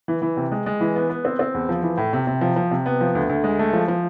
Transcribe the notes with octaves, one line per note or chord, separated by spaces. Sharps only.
E3
E3
C3
G#3
G#3
E3
B3
B3
C4
C4
E2
F3
E3
A2
C3
C3
F3
F3
C3
B3
F3
D2
D2
G#3
A3
F3
F3